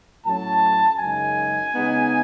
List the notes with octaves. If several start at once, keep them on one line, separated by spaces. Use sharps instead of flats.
A2 F#3 C#4 A5
F#2 C#3 G#3 D#4 G#5
C#3 G#3 B3 D#4